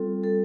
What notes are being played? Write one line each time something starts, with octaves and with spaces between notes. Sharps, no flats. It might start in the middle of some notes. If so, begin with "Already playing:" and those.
Already playing: G3 C4 F4 A4
G3 A4